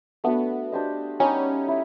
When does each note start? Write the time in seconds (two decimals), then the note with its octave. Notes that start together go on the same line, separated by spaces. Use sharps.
0.24 A3 B3 D4 F#4 B4
0.72 D4 G4 C5 D#5
1.20 G3 B3 C#4 D#4 G4
1.68 E4